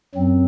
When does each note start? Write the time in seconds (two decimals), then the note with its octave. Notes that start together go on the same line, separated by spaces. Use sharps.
0.15 F#2 F#3 C4